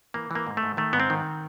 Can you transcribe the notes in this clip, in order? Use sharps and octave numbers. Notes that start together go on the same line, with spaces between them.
E3 A#3
E3 A#3
G#2
A3
G#2
D#3 A3
G#2 B3
C4
D#3